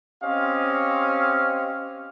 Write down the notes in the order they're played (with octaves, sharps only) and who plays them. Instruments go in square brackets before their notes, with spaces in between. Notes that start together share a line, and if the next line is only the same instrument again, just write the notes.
[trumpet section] C4 C#4 G4 C5 D#5 F5